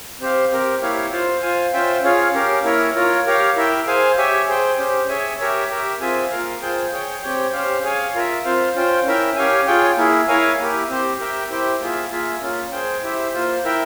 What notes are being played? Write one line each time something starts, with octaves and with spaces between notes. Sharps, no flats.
C4 G4 C5 F5
C4 G4 A#4
A#3 E4 G4 C#5 F5
F4 C5 F5
F4 C5 F5 G#5
C#4 F4 C5 E5 G5
C#4 F4 G#4 C#5 F5
C#4 G4 A#4 F5
A#3 E4 A#4 C#5
F4 A#4 C#5
G4 A#4 C#5 F5
E4 A#4 E5 G5
G#4 C5 F5 G#5
G4 C#5 E5 G#5
G#4 C5 G5
C#4 G4 C5
G#4 C#5 E5 G#5
G4 A#4 C#5 E5
G4 A#4 E5
C4 F4 G#4 E5 G#5
A#3 F4 A#4 F5
F4 G#4 C5 G5
G#4 C#5 G5
C4 G4 C#5 G5
C#4 G4 C5 F5
G#4 C#5 F5 G#5
F4 A#4 E5
C4 F4 C5 F5
C#4 F4 C5 G5
C#4 E4 A#4 E5 G5
C#4 G4 C#5 F5 G#5
F4 G#4 C#5 G5
A#3 E4 G#4
E4 A#4 C#5 F5 G#5
A#3 E4 G4
C4 G4 C5
G4 A#4 E5 G5
E4 G4 C5 G5
A#3 F4 G#4 E5
A#3 F4 G#4 E5
A#3 C#4 F4
G#4 C5 G5
E4 G4 C5 E5
A#3 F4 C5
E4 A#4 E5 G5